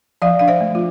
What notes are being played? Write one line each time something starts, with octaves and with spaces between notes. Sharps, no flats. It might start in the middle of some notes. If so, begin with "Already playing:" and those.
F3 D5 F5
D4 F5
C5 E5
A3
F4